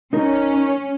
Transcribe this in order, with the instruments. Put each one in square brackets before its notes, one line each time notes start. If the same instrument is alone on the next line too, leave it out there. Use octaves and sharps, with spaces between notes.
[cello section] C#4 [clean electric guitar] D#4 A#4